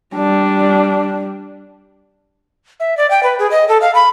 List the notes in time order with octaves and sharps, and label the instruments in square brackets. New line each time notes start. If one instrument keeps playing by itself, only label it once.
[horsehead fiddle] G3 [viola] D4
[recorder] E5
D5
G5
B4
G#4
D#5
A4
F5
B5